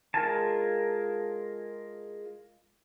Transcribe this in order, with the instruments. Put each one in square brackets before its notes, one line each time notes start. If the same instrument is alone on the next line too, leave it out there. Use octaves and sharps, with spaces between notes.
[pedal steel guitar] G#3 F4 A#4 G#5 A5